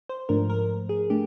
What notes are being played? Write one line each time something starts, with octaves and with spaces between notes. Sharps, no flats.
C5
G#2 F3 A3 D4 A#4
A#4
G#4
A3 D4 G4